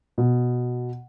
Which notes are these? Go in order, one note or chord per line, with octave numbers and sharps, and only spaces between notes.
B2